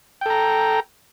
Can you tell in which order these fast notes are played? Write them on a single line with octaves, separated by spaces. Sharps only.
G5 A4 A#5